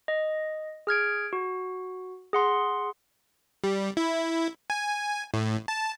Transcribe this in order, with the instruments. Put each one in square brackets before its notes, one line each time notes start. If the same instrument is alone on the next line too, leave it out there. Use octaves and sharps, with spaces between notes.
[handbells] D#5
G#4 F6 G#6 D7
F#4
G#4 F#5 C6
[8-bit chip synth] G3
E4
G#5
A2
A5